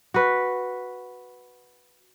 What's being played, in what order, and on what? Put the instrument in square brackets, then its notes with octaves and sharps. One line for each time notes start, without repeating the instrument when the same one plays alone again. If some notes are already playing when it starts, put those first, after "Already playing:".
[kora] F#4 B4